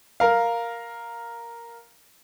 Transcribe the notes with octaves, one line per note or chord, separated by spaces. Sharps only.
A#4 F5